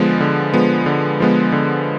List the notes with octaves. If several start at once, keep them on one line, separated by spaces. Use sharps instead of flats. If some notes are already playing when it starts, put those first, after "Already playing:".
Already playing: D3 F3 G#3 B3
D3
F3 G#3 B3
D3
F3 G#3 B3
D3